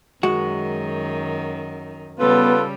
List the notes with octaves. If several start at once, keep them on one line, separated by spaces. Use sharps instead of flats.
F#2 D#3 G#3 F#4
C#3 G3 B3 F4 A4 B4